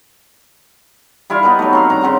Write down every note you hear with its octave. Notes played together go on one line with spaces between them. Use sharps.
G3 E4 F4 F5
B3 D#4 G4 B4
F#3 A3
C4 F#4 F5
G2 D#3 A#5
C#3 C4 F#4 C5